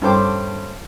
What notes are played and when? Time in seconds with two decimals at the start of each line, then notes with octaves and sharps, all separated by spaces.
0.02 G2 C#4 A4 C5 G5 D6